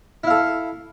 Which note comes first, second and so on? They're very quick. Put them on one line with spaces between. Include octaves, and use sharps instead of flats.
E4 F5 A4